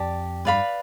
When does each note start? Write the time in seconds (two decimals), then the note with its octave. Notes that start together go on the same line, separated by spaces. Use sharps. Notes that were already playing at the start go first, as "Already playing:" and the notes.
Already playing: F2 G4 D5 A5
0.45 G2 B4 D5 F5 B5